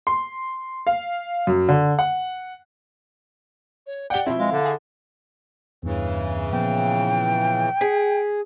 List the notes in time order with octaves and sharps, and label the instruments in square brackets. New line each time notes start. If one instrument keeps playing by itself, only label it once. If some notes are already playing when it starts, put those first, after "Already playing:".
[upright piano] C6
F5
F#2
D3
F#5
[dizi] C#5
[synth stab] G4 G5 [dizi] D5 [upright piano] F#5 G7
[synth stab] B2 F3 C4 [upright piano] E4
[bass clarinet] G#3 [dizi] F5
[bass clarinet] D3
[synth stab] G#4
[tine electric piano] E2 G2 [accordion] C#3 E3
[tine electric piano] A#2 F3 B3 [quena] G5
[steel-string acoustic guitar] G#4 [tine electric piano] B6